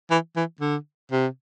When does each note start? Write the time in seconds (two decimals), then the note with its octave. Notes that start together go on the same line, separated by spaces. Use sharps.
0.10 E3
0.36 E3
0.61 D3
1.12 C3